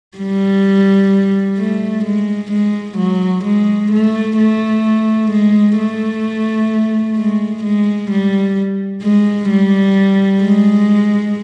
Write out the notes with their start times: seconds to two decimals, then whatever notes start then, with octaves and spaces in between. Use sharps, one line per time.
0.18 G3
1.59 A3
2.04 G#3
2.51 G#3
2.97 F#3
3.44 G#3
3.92 A3
4.38 A3
5.31 G#3
5.78 A3
7.17 G#3
7.64 G#3
8.11 G3
9.03 G#3
9.50 G3
10.42 G#3